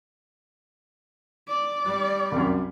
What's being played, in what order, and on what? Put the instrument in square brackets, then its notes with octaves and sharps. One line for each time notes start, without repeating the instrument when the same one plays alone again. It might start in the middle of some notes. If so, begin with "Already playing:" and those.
[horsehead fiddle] D5
[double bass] G3
[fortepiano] C2 F#2